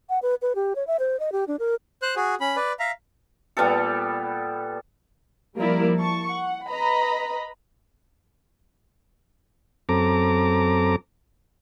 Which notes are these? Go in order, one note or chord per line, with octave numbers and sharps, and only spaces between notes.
F#5
B4
B4
G4
C#5
E5
C5
D#5
G4
D4
A#4
C5 F#6
F#4 G#4
C#4 B5
B4 D5
E5 F5 A#5
A#2 G3 B3 A4
F3 G3 A#3 E4 A#4 D5
A5 C#6
F#5
B4 D#5 A#5 B5
F#2 C4 A4 A#5 D6